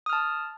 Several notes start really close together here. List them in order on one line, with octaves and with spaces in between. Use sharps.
D#6 F6 A5